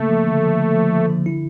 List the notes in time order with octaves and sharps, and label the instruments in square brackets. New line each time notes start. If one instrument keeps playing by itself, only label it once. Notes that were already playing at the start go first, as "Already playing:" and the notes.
Already playing: [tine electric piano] C#3 A#3 [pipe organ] A3
[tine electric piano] F3
D3
F3
D3
F3
F3
D3
E4